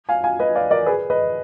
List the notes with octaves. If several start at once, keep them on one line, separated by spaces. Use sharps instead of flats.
F5 G#5
F5 G#5
B4 D#5
D5 F5
A#4 D5
G#4 B4
B4 D#5